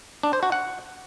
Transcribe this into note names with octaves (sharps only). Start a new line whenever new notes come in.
D4
C5
F#4
F#5